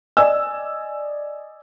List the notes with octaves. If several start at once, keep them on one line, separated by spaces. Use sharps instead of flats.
D5 D#5 G#5 E6